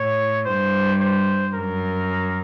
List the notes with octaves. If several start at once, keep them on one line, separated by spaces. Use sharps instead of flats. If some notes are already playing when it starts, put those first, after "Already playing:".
Already playing: A2 C#5
G2 C5
C5
F#2 A#4